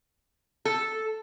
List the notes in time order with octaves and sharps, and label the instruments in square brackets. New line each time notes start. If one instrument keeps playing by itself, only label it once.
[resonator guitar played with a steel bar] A4